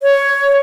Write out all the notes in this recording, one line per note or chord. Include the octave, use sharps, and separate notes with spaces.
C#5